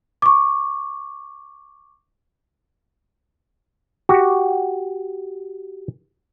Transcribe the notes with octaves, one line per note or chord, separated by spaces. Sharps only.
C#6 D6
F#4 G4